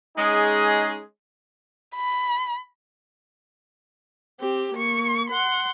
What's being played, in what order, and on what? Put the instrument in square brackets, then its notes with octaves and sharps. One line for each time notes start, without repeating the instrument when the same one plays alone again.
[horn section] G#3 C#4 D#4 G#4
[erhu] B5
[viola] C4 G4
A#3 C#6
F#5 C6